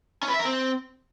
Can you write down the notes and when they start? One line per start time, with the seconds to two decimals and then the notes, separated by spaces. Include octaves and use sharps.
0.23 C#4
0.28 B4
0.34 E5
0.39 A#4
0.45 C4